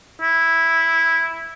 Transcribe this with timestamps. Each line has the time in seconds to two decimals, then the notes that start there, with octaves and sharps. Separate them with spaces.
0.21 E4